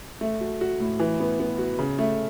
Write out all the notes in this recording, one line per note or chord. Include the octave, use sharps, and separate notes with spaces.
A3
F#4
F#4
A2
E3
B3
B3
F#4
C#3
A3